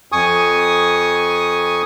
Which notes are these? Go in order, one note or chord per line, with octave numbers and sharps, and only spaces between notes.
F2 G#5 C#6 D#6